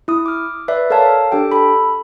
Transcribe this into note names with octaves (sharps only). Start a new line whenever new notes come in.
E4 D#6
D6 F6
B4 D5 E5
A4 A#4 C#5 F5 A5
D4 G4 A4 G5
A4 B5